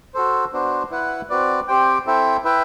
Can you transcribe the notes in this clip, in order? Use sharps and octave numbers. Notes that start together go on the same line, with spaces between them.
F#4 A4 C5
B3 D4 F#4 C5
E4 B4 F#5
C4 F#4 B4 D5
C4 G4 C5 G5
C4 E4 A4 E5 G5
E4 B4 E5 G5